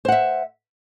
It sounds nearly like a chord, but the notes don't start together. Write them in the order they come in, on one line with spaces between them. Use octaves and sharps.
C5 F#5 E5